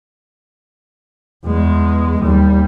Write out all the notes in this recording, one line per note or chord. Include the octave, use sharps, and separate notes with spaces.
E2 G#3
D#2 G3